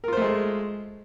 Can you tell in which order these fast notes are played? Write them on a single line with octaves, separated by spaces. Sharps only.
A#4 F4 C5 A3 G#3